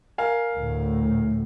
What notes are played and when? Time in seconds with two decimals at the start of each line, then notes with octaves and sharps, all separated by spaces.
0.18 A#4 F5 G#5
0.57 D2 A2